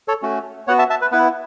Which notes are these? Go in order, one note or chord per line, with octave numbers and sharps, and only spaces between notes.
A4 C#5
A3 C#4 F#4
B3 F#4 C#5 F#5
E5 A5
E5 A5
B4
B3 E4 B4